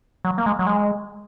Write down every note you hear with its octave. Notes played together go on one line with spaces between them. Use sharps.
F#3
A#3
G#3
F#3
G#3